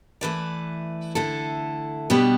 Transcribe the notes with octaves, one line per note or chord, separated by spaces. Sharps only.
E3 A3 E4 B4 D5
D3 A3 E4 A4
B2 G3 B3 D4 G4